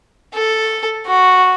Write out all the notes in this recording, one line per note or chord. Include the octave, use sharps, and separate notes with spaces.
A4
F#4